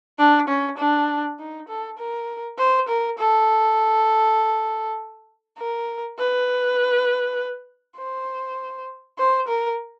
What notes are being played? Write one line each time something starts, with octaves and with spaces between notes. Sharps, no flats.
D4
C#4
D4
D#4
A4
A#4
C5
A#4
A4
A#4
B4
C5
C5
A#4